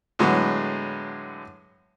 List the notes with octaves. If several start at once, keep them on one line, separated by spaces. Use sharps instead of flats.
A2 D3 F#3 G#3 B3